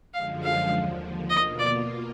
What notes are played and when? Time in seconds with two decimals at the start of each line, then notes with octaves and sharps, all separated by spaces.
0.14 F#2 D3 F3 G#3 F5
0.43 F5
0.72 D#2 D3 F3
1.30 B2 A#3 F4 D#5
1.59 D5